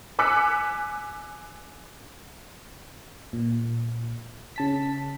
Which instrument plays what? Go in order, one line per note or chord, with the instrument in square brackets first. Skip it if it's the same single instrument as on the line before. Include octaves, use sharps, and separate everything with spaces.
[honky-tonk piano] G#5 D6 E6 F#6 B6 C#7
[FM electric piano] A#2
C#3 A5 B6